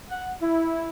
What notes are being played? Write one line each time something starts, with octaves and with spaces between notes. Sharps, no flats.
F#5
E4